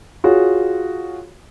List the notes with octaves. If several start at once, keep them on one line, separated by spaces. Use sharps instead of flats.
F4 F#4 G#4 C#5